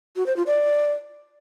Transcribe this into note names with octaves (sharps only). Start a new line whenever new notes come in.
F#4
C5
F4
D5